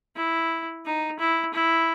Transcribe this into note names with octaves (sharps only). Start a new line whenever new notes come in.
E4
D#4
E4
E4